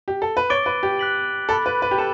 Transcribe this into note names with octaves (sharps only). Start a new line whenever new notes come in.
G4
A4
B4
C#5 D6 A6 D7 G7
B4
G4
F#6 B6 F#7
A4 B5 D6 A6
B4
B4
G4
A4 E7